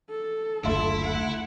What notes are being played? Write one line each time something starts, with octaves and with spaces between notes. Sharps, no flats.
A4
F#1 D2 A3 E4 F4 E5
F#5